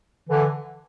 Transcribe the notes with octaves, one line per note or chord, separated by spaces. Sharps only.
D3 E3